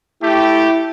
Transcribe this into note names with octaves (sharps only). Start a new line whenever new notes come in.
A3 E4 G4